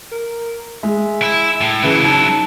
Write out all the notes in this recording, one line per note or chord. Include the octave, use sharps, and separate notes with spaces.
A#4
G#3 E5
E4
A2
C#3 E3 F#3 E4
D#4 A5